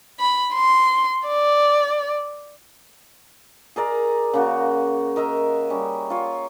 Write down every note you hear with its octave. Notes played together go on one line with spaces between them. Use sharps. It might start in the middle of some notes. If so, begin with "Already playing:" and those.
B5
C6
D5
G#4 A#4 D5 A#5
C#3 A#3 F#4
A#4 D#5 E5 A#5
G3 C#4
F4 C#5